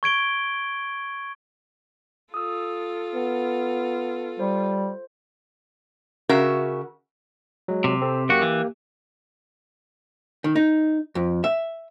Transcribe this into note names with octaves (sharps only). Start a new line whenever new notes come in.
C#6 G#6 D7 G7
F4 A4 D#6 E6
B3
G3 C5
C#3 F#4 A#4 E5
F#3 G#3
C3
C4 A4
F#2 A#3 F#4 G4
E3
D#3
D#4
F2
E5